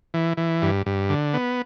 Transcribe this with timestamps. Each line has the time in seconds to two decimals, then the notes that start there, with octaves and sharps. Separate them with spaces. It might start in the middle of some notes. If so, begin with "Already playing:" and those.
0.14 E3
0.37 E3
0.62 G2
0.86 G2
1.09 D3
1.34 B3